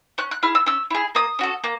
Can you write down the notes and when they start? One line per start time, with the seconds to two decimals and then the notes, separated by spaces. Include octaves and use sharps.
0.18 C#4 F#6
0.31 F#6
0.43 E4 G#4 F6
0.55 E6
0.66 C#4 E6
0.91 E4 G#4
1.15 A#3 D#6
1.39 C#4 F#4 A4
1.64 A#3